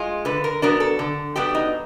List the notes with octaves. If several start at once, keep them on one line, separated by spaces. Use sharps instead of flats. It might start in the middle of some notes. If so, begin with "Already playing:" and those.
Already playing: G#3 F4
D3 B4
A#4
F#3 B3 D4 A#4
A4
D3
F#3 B3 D4 G4
D#4